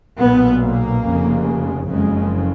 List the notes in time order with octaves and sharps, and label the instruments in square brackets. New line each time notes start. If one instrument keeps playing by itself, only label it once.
[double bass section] B1 A#2 B3
A#3
F1 F2 C#3
F#1 F2 C#3 G#3